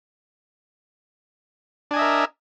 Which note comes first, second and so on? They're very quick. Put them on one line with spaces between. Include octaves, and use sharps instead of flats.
D4 G#5 D#5 E5 A#4